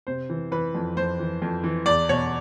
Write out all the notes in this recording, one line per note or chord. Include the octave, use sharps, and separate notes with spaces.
C3 C5
E3
E3 B4
F2
F2 C5
E3
F2
E3
E2 D5
B2 C#5